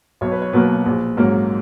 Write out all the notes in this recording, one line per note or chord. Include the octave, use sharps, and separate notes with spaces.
B1 C#5
B4
C#5
B2 F#3 A#3 B4
A#1
G#2 F#3 A#3 C#4